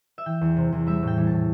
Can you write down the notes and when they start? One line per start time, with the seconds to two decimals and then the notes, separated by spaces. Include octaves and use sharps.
0.18 E5
0.26 E3 G5
0.41 E2
0.57 C3
0.72 E2
0.86 G3 E5
1.03 A2 G5
1.18 E3
1.27 A5
1.32 A2